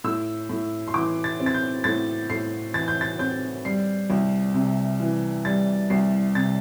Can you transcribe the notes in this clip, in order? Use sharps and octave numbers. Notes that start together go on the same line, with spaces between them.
A2 E6
A2
C6
E3 D6
A6
C4
A6
G6
A2 A6
A2 C7
E3 A6
G6
A6
C4 G6
G3 C7
C2
C3
E3
G3 A6
C2 C7
C3 A6